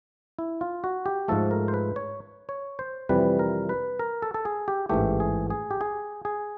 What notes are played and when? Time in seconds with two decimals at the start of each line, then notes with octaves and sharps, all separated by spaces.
0.39 E4
0.61 F4
0.84 F#4
1.06 G4
1.28 G#2 F3 A3 A4
1.51 A#4
1.68 C5
1.74 B4
1.96 C#5
2.49 C#5
2.79 C5
3.09 F2 C3 E3 G3 B4
3.39 A#4
3.69 B4
3.99 A#4
4.22 A4
4.34 A4
4.45 G#4
4.68 G4
4.89 A1 G#2 E3 A3 G4
5.20 G#4
5.50 G#4
5.71 G4
5.81 G#4
6.25 G#4